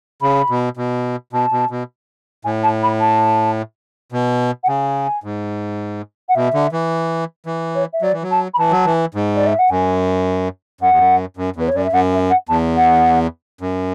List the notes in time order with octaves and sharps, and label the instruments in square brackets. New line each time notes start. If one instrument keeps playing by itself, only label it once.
[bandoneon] C#3 [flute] B5
[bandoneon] B2
B2
[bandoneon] B2 [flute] A5
[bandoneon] B2
B2
[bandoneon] A2 [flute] G#5
[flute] A5
B5
A5
[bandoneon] B2
[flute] F#5
[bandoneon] C#3 [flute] G#5
[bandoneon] G#2
[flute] F#5
[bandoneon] B2 [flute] E5
[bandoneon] D3
E3
E3
[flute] C#5
E5
[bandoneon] F#3 [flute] D5
[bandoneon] E3
F#3
[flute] A5
B5
[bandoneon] E3 [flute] A5
[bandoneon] F#3
E3
G#2
[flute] D5
E5
F#5
[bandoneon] F#2 [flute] G#5
[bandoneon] F#2 [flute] F#5
[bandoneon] E2
F#2
F#2
[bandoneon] E2 [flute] B4
[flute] C#5
[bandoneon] F#2 [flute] D5
[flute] E5
[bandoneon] F#2 [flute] F#5
[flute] E5
F#5
[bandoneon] E2 [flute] A5
[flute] F#5
[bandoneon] F#2